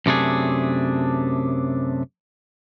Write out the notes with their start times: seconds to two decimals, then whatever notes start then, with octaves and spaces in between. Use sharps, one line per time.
0.06 F#2 C3 A3 D4 G#4